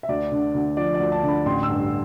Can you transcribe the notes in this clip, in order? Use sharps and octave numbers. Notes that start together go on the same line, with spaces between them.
E5
D2 D5
D3
D2
F3 D5
D5
D2
A5
D3
B5
A1 C6
E6
G2